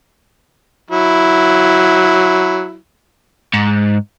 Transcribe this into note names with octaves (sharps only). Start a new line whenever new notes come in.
F#3 E4
G#2